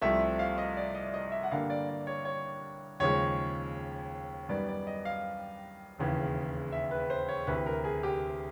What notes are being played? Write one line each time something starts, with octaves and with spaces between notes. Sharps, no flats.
C2 C3 F3 A3 E5
F5
D#5
D5
D#5
D#5
E5
F#5
G2 D3 G3 A#3 F5
D5
D5
C#5
C#5
D#2 C#3 F3 G#3 C#5
F#2 D#3 G3 B3 D5
D5
D#5
F5
E1 D#2 C#3 E3
E5
B4
C5
C#5
D2 C3 E3 B4
A#4
G#4
G4